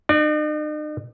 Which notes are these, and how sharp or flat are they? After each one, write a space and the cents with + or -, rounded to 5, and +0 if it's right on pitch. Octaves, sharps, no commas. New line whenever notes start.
D#4 -45 D5 +5